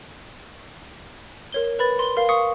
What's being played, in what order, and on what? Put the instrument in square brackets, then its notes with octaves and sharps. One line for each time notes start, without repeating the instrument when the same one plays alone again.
[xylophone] A#4 C#5 G7
A#4 B4 B5 A6
C6 G7
A#4 F5
F5 C#6 D#6 C#7